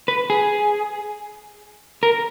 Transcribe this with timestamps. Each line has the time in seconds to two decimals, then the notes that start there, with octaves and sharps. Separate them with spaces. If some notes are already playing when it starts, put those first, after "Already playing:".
0.08 B4
0.30 G#4
2.03 A#4